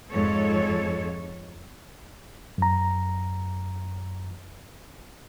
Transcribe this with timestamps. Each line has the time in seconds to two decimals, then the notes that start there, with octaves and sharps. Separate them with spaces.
0.11 F2 G#2 A4 C#5
2.58 F#2 A#5